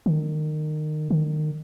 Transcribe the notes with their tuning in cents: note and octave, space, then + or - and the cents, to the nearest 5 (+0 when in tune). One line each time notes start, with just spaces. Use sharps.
D#3 -25
D#3 -30